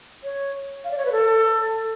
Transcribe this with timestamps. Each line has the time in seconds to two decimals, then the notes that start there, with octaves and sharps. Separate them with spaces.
0.24 C#5
0.84 F5
0.91 D5
0.98 C#5
1.05 B4
1.12 A4